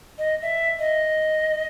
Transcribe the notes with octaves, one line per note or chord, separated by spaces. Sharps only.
D#5
E5
D#5